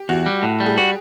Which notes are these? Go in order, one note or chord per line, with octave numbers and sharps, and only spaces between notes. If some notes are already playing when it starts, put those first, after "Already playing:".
Already playing: G4
E2 F#4
G3
A2
G3
G#4
F#4 G4